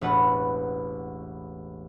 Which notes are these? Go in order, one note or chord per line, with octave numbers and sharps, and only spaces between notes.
E1 A1 B4 F#5 C#6